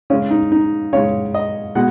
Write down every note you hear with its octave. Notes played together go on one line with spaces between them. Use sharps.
C#3 G#3 C#4
D#4
D#4
C#3 G#3 C#5
D#5
B2 G#3 F#5